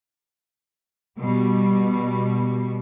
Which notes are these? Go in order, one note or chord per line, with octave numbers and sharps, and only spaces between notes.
B2 G3